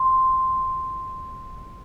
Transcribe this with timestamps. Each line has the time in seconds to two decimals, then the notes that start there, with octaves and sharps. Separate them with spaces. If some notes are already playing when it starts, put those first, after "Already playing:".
Already playing: C6